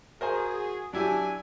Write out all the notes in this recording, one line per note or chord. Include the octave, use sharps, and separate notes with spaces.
F#4 G#4 A#4 C5 G#5
F#3 D4 E4 G4 G#5